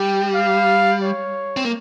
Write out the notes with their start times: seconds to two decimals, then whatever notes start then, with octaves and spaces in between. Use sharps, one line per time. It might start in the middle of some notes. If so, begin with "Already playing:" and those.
Already playing: G3 G5
0.34 F5
1.04 C#5
1.57 C4
1.65 A#3